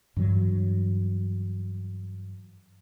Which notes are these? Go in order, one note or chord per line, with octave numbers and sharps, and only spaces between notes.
G2 E3 F#3